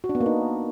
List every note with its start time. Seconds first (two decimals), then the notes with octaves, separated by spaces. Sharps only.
0.04 F#4
0.09 D4
0.15 B3
0.20 A#3
0.26 D#4